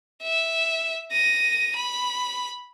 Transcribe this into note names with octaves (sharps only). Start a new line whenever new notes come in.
E5
A#6 D#7
B5